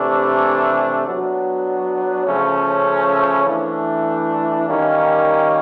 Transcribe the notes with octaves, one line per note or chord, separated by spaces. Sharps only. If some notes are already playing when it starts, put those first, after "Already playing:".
Already playing: C3 E3 A3 D4
F#3 B3 D4
C#3 F3 A3 C#4
E3 A3 D4
D#3 G3 A#3 C#4